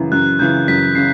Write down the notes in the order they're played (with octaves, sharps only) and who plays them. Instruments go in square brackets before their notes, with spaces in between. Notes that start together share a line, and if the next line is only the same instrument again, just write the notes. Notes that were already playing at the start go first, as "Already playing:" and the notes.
Already playing: [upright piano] F#2 C#3 E3
[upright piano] F#2 [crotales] F#6
[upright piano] C#3 E3 [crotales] G6
[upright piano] F#2 [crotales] B6
[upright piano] C#3 [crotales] C7